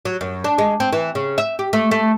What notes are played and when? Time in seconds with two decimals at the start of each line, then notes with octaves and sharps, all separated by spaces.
0.05 F#3
0.21 F#2
0.44 D4
0.58 G#3
0.80 C4
0.93 E3
1.15 C#3
1.38 E5
1.59 G4
1.73 A3
1.91 A3